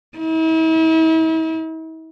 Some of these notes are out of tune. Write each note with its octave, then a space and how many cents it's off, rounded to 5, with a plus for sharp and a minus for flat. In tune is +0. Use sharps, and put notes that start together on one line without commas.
E4 -45